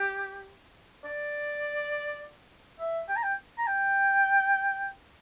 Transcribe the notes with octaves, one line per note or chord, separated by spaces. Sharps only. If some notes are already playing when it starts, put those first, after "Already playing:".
Already playing: G4
D5
E5
G5
A#5
G5
A#5
G5